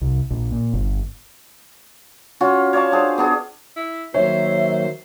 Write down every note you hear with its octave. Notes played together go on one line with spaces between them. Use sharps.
C2
A#1
A#2
G1
C#4 F4 F#4
C#5 D5 F5 A5
D4 G#4 C5
B3 D4 G#4
E4
D#3 F#3 A#3 C5 C#5 E5